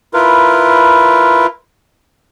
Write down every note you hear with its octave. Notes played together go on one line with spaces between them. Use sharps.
E4 F4 A#4 B4